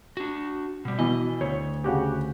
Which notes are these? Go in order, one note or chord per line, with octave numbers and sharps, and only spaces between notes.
D4 F#4
B2 G3
B2 E3 D#5
D2 C#5
C#3 F#4 G4